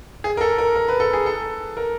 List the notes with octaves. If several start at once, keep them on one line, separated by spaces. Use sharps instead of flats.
G#4
A#4
A4
A#4
A#4
B4
A4
G#4
A4
A#4